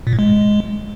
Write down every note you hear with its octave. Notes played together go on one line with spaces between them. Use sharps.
A#2
A2
G#3